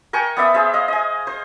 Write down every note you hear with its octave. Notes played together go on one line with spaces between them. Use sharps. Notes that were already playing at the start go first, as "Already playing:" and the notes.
A#4 G5 G#5 C#6
B3 D5 E5 D#6
G#4 C5 E5
D#5 F5
D#5 G#5
C5